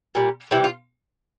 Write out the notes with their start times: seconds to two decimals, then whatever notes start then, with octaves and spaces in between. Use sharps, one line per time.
0.15 A#2 G3
0.51 C3 E3 G3 E4
0.64 F4